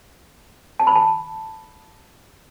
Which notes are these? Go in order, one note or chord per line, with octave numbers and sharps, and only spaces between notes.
A5
B5
A5